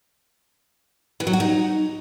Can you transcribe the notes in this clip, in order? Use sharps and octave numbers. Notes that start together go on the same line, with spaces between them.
E3
F#3
F#4
D#4